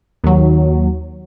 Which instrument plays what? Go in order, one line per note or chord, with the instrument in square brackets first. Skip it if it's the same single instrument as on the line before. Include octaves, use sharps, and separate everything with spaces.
[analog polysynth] D#2 F#3